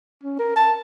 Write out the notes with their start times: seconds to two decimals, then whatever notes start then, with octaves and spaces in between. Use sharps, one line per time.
0.24 C#4
0.39 A#4
0.56 A5